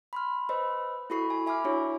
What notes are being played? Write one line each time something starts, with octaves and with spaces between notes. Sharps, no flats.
B5 C6 F6
B4 C5 D#5 B5 E6
E4 F#4 A4 B5 C#6 C7
G#5
E5 G#5 B5 D6 F6
D4 E4 F#4 C#5 C#6